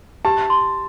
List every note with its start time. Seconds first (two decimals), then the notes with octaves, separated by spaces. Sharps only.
0.25 G4 A5
0.50 C6